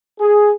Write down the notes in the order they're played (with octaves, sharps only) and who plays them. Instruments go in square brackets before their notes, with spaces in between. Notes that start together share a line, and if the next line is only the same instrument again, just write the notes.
[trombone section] G#4